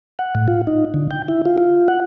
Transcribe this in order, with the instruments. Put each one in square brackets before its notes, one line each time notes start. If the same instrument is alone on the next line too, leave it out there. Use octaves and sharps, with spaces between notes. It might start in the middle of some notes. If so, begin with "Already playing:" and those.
[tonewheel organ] F#5
A2
F4
D#4
D3
G5
E4
F4
F4
F#5